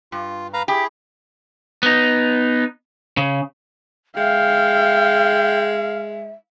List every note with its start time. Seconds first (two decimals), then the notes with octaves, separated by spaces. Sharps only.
0.12 G2 F4
0.54 B4 F5 A#5
0.68 E4 G4 G#4
1.83 B3 D#4
3.17 C#3
4.17 G#3 E5 F5 G5